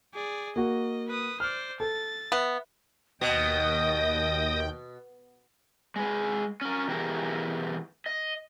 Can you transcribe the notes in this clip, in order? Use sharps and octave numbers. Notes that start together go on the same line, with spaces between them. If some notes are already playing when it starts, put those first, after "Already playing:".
G#4 D5
A#3 F#4 D#5
B4 D#6
C5 D5 F6
A4 A6
B3 E5
D#2 B2 D#5 G5 D#6 A#6
G#3 G#4 B4
C#4 A#4
B2 E3 G4 G#4 A#4
D#5